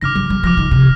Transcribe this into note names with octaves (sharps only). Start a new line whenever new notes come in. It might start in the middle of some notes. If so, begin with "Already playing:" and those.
D3 D6 F6 A#6
G3
G3
F3 D6 F6 A#6
D#3
C3